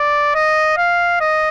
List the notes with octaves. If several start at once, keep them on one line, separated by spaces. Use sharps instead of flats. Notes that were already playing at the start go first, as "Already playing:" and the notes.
Already playing: D5
D#5
F5
D#5